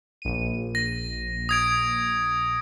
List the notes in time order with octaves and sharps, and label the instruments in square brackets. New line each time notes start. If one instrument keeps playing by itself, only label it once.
[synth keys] A#1 D#7
[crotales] A#6
D#6 G#6 D7